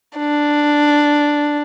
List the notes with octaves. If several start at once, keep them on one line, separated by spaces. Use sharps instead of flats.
D4